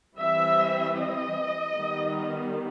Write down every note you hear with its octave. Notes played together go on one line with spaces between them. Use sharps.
E3 G3 C4 E5
D#5
D#3 G3 B3